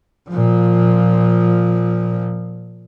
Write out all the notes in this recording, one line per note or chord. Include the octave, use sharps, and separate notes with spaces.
A#2 F3